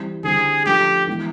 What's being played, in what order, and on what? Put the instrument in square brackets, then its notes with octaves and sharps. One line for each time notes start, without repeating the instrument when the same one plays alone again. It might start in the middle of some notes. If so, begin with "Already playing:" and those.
Already playing: [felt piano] E3 G3 C4 E4
[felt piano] D3 G3 C4 E4 [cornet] G#4
[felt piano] F3 A3 D4 [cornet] G4
[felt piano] E3 G#3 B3 E4